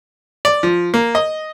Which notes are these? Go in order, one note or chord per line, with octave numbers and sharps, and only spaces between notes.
D5
F3
A#3
D#5